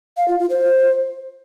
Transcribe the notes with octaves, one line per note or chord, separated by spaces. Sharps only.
F5
F4
F4
C5